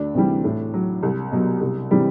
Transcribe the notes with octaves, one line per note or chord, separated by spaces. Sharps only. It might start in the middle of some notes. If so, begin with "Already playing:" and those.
Already playing: D2 D4
C3 E3 G3
A2
F#3
C2
B2 F#3
C2
C3 E3 G3